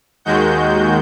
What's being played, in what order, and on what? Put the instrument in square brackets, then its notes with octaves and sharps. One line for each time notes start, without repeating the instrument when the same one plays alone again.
[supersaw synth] D#2 D#3 G#3 F#4 G6